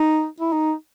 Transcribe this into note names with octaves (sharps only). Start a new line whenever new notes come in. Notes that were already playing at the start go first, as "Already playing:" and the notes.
Already playing: D#4
E4
D#4